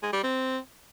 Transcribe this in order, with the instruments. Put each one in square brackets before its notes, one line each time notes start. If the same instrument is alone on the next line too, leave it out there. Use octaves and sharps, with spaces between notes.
[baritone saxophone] G#3
G3
C4